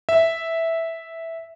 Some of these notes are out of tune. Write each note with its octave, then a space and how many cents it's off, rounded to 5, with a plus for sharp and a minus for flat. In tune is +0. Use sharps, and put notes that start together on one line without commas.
E5 -5